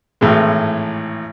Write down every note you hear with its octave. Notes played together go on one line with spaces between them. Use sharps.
G#1 A2 E3 G#3